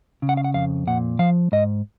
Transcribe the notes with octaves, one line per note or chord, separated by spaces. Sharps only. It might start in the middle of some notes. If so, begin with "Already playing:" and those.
C#3
F#5
F5
F#5
F2 F5
A#2 F#5
F3 F5
G#2 D#5